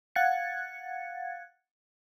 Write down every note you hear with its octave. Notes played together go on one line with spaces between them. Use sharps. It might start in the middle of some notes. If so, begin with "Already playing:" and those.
F5 F#5 F#6 G#6 A6 C#7